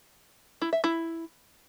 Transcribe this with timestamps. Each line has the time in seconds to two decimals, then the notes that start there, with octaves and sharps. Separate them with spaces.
0.62 E4
0.73 E5
0.84 E4